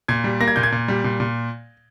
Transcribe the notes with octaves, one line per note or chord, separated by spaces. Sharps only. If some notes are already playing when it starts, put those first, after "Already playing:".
A#2 G#6
G3
A#3 A#6
G#6
A#2 G6
G#6
A#2
G3
A#2
A#2